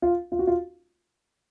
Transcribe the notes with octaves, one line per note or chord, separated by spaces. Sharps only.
F4
F4
F#4
F4